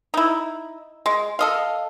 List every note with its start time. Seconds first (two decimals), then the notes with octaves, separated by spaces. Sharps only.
0.14 D#4 E4
1.06 G#3
1.39 A4 D#5 F5